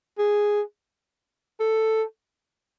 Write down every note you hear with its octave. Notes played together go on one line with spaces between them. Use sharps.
G#4
A4